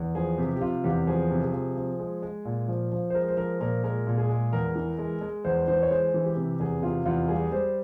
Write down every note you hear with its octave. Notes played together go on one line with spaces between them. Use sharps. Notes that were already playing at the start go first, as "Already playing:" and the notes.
Already playing: E2
F3 G#4
C3 G4
G4
C3 F4
E2 G4
F3 G#4
C3
G#4
F3
F3
G#3
G#3
A#2
F3
F3
C5
G#3 A#4
C5
F3 A#4
A#2 A#4
G#3 A#4
A#2
G#4
G#3
E2 A#4
E3
G#3
G#3
E2 C5
E3 C5
C#5
G#3 C5
E3
G4
C3
E2 G#4
C3 F4
E2 F4
G3 G#4
G3 C5